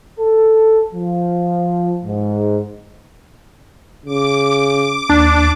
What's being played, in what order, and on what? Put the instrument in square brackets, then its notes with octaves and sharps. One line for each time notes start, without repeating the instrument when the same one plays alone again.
[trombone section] A4
F3
G#2
[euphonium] C#3 [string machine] D6
[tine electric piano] D#2 [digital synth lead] D4